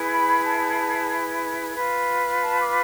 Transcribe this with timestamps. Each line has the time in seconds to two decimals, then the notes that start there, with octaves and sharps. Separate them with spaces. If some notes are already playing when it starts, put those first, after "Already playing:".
Already playing: E4 G#4 B4
0.10 B5
0.44 A5
1.76 F4 B4
2.42 A5
2.59 D6